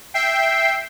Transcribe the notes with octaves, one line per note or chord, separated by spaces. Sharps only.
E5 G5 C7